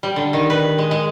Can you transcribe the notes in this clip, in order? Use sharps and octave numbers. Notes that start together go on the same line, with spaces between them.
G3
D3
D#3
B4
G#3
G#3